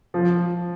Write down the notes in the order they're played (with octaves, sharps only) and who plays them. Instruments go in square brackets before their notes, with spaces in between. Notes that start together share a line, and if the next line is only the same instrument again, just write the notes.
[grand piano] F3